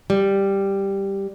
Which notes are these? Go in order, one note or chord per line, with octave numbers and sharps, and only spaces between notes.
G3